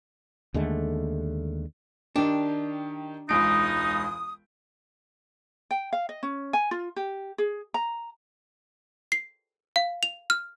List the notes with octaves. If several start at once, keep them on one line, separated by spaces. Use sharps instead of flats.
D#2 D3 G#3 A3
D#3 D4 G4
E1 C#2 D#4 D#6 D7
G5
F5
D#5
C#4
G#5
F4
G4
G#4
A#5
C7
F5
F7
F6